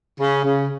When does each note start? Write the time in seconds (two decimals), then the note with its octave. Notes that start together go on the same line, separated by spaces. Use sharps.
0.20 C#3
0.45 C#3